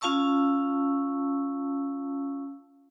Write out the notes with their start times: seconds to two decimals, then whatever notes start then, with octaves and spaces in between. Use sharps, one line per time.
0.01 C#4 F4 F5 A5 C#6 E6